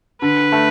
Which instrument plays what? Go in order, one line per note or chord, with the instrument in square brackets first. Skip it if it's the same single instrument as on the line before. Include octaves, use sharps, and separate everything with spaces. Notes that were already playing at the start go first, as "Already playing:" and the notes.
[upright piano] D3 [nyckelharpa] B4
[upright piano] A3